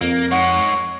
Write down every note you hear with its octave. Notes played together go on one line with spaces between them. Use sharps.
F2 A#3
G#3 D#4 C#5 F#5